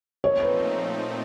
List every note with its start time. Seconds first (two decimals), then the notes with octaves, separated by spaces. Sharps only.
0.23 A#2 F3 A3 C4 D#4 C#5
0.41 B4